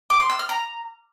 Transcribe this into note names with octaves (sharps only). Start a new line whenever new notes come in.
D6
C6
E6
F6
A#5